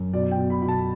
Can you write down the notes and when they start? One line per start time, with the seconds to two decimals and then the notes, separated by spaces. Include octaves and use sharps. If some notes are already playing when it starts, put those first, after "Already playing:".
Already playing: F#2
0.13 B2 D5
0.31 G5
0.37 B2
0.50 B5
0.62 B2 B5
0.68 A5